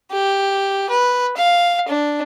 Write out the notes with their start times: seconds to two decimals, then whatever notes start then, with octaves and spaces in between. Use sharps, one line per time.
0.11 G4
0.90 B4
1.37 F5
1.88 D4